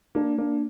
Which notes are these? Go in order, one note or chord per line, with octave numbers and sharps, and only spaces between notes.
A#3 D4
A#3 D4